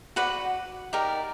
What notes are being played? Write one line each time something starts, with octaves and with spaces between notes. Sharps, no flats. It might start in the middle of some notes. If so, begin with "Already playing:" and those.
F#4 B4 D5 F#5
D#4 G4 A#4 D5